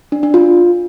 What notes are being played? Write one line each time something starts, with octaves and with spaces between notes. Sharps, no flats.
D4
D4
F4